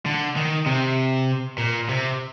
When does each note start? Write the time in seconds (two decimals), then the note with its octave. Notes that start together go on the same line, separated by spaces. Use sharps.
0.06 D3
0.37 D#3
0.66 C3
1.58 A#2
1.89 C3